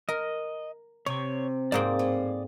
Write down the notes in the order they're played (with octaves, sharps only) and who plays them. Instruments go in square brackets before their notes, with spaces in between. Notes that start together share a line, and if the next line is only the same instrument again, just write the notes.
[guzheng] A#4 [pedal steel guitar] D#5
[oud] C3 [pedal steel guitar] C#5 C#6
[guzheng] G#2 A#3 C4 [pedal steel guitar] D5 D#6
[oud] A2